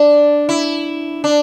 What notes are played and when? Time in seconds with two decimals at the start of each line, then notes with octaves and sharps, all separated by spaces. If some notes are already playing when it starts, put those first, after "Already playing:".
Already playing: D4
0.49 E4
1.24 D4